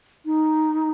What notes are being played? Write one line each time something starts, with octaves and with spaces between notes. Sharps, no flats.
D#4